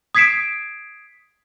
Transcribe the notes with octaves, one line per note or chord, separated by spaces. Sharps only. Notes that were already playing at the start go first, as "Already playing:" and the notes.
D#6 G#6 B6 C7 D7 E7